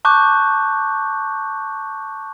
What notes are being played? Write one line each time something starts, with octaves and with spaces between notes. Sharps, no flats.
A5 C#6 D6 F#6 G6